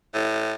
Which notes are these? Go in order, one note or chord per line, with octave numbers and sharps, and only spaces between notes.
A2